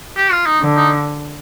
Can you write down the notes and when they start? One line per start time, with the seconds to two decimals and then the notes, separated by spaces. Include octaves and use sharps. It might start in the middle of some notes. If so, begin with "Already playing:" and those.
0.17 G4
0.32 F4
0.46 D#4
0.61 D3
0.76 D#4